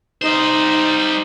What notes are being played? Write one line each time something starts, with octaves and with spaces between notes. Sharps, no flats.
G3 D#4 C5 D#5